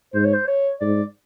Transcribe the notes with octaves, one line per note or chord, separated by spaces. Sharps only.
G#2 C5
C#5
C5
C#5
G#2 D5